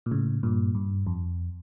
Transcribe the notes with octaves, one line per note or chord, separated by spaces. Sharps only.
A#2
A2 C#3
G2 A#2
G2
F2